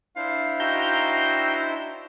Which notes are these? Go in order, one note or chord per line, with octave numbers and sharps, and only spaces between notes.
D4 E4 C5 F5
D#4 F#4 G5 A#5 E6 G6